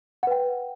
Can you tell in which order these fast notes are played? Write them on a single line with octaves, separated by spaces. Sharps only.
F#5 B4 G5